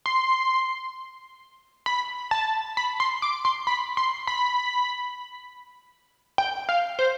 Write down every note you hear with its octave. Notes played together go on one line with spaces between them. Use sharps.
C6
B5
A5
B5
C6
D6
C6
B5
C6
B5
G5
F5
C5